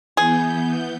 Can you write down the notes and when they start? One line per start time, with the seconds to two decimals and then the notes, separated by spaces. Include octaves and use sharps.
0.17 E3 B3 G#4 G6